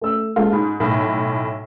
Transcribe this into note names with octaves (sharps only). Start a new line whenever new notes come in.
A3 E6
G#3 A#3 F4 A4
G#2 B5
B1 A2